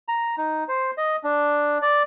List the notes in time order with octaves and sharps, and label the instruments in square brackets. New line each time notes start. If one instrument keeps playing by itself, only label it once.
[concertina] A#5
D#4
C5
D#5
D4
D5